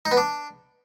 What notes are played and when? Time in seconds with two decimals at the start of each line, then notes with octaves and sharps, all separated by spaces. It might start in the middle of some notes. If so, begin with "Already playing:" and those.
0.05 D#4
0.11 B3
0.17 D4